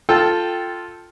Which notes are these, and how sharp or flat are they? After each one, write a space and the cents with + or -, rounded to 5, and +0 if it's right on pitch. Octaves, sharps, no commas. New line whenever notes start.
F4 +0 A4 +0 G5 +0